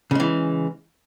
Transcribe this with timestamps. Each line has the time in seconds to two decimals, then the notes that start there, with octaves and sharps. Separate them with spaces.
0.11 C#3
0.15 G#3
0.20 E3